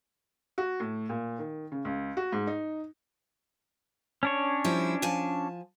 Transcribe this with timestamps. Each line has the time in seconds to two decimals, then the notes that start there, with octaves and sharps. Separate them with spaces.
0.58 F#4
0.80 A2
1.09 A#2
1.39 D#3
1.72 C#3
1.85 C#2
2.17 F#4
2.33 G#2
2.47 D#4
4.23 C#4 D4 C#5
4.64 F3 G3 E4
5.02 F3 G#5 A5